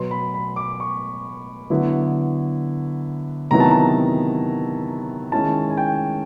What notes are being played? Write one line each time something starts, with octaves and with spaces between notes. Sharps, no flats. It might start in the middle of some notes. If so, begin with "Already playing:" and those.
Already playing: B2 F#3 B3 C6
B5
B5
D6
C#6
D3 F#3 B3 E4
C3 D#3 F#3 B3 E4 A#5
A5
A#5
D#3 G#3 C#4 E4 A5
G#5
G5